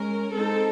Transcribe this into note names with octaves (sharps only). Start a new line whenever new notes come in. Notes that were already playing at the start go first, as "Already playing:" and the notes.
Already playing: G#3 C#4 A#4
G#3 C4 D#4 A4